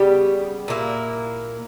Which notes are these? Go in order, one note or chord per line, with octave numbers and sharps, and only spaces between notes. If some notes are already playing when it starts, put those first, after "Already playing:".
Already playing: C#3 G3 B3 G4
A#2 A#3 E4